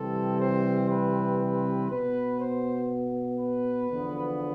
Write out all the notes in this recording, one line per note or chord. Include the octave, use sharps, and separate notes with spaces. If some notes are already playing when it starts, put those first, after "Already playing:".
Already playing: C3 E3 G3 C4 A4
C5
B4
B4
B2 B3 B4
C5
B4
E2 D3 F3 B3